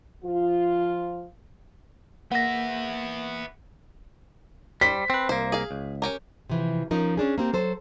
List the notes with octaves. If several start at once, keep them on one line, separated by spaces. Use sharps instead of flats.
F3 F4
A#3 B3 E5 F#5 A#6
G3 C5 B6
C4 B4
C2 A#3 C5
G#4 F5
C#2
C#4 G4 A#4
C3 E3 F3
F3 C#4 D#4 A#4
C#4 D4 G#4
A#3 C4 G4
F#3 A4 C5